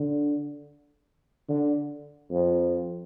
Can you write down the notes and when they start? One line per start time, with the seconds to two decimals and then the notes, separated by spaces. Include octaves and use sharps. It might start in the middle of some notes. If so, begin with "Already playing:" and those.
Already playing: D3
1.49 D3
2.31 F2